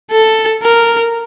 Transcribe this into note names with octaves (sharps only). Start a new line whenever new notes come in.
A4
A#4